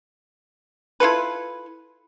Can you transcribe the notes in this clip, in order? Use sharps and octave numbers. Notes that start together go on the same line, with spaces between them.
E4 F4 A4 B4